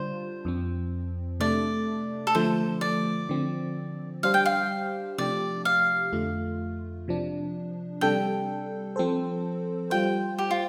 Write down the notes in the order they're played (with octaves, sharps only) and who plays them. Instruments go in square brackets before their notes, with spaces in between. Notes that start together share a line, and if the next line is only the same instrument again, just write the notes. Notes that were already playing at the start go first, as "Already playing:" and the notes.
Already playing: [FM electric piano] D3 G3 D4 F4 [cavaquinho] C5
[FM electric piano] F2 F3 C4
[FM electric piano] C3 A3 D4 [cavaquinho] D5
[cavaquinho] A4
[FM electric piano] D3 F3 A3 [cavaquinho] C5
[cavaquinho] D5
[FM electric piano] D3 F3 C4
[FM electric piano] G3 D4 G4 C5 [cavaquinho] F5
[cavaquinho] G5
F5
[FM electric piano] C3 F3 A3 D4 G4 [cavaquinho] D5
[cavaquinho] F5
[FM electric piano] F2 D3 A3 F4
C3 F3 D4
[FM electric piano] C3 G3 D4 A4 [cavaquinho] G5
[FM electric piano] F3 C4 A4 C5
[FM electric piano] G3 F4 C5 [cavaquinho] G5
[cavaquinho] G4
F4